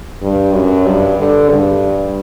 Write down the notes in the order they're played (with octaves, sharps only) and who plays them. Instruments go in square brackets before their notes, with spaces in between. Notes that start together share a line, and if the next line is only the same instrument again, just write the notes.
[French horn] G2
F#2
G2
D3
G2